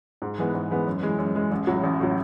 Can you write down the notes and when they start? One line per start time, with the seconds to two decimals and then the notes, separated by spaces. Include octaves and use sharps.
0.22 G#2
0.38 E3 G#3 B3
0.54 G#2
0.71 E3 G#3 B3
0.87 F#2
1.03 E3 G#3
1.18 F#2
1.35 E3 G#3
1.52 A1
1.67 A2 F#3
1.84 A1
2.00 A2 F#3